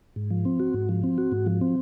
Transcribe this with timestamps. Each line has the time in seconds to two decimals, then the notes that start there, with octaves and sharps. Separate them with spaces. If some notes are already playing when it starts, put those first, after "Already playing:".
0.16 G#2
0.30 F3
0.45 C4
0.60 F#4
0.74 G#2
0.89 F3
1.04 C4
1.18 F#4
1.32 G#2
1.46 F3
1.61 C4